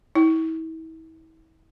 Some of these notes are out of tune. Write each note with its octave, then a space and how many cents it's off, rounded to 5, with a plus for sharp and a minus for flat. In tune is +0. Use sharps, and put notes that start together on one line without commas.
E4 -40